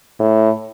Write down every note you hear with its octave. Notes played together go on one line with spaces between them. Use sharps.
A2